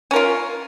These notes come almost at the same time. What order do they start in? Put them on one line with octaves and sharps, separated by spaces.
C#4 A#4 F4